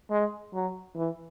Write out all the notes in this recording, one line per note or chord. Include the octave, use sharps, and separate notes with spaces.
G#3
F#3
E3